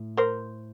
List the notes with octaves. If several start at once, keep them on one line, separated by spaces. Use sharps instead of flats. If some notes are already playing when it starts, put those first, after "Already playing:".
Already playing: A2
A#4 C5